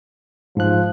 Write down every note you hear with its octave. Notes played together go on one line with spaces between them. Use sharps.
G#2 F3 F#6